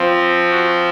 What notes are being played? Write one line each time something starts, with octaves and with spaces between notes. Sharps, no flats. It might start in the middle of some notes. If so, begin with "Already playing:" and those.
Already playing: F3 C4
F#4